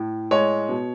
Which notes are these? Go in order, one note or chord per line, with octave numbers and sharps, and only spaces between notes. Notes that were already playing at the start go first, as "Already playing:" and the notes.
Already playing: A2
G#3 C#5
B2